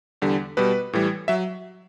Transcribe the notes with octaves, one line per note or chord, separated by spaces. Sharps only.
E2 D3 G3
B2 G3 B4
A2 E3 G3
F#3 E5